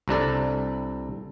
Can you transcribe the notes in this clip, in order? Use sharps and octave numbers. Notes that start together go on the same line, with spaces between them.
C2 C3 D4 A4